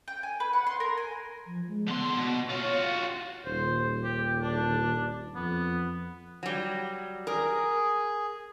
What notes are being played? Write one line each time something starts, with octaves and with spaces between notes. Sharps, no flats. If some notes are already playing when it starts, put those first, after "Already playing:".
G5
G#5
B4
F#5
C6
A#4
G#5
F3
G#3
D3 B3 C6
B2
F4 F#4 C#5
F5
D#1 C5
G4
D4
F2 B3
F#3 G3
G#4 A#4